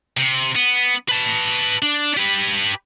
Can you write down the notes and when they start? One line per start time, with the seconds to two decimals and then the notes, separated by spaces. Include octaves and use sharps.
0.17 C3
0.55 B3
1.09 B4 A5
1.82 D4
2.17 G4 B4